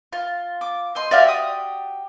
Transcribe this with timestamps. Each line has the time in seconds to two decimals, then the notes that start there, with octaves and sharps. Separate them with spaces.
0.13 F4
0.61 D6
0.95 C5 D#5 C6
1.11 F#4 G4 D5 E5 F5
1.28 D#6